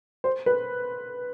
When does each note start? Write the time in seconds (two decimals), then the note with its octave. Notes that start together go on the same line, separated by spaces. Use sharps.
0.24 C5
0.46 B4